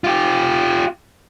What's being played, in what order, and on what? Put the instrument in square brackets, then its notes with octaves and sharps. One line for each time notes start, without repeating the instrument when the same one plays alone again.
[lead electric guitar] F4 G4